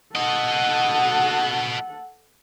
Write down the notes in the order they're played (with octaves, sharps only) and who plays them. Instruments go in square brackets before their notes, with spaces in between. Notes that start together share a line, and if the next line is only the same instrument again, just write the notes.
[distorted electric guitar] F#4 D#5 [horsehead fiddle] A4 F#5